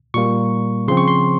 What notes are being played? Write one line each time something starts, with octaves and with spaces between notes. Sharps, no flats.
A#2 G3 A#3 C#6
C#3 F3 C4 C6
C#6
C6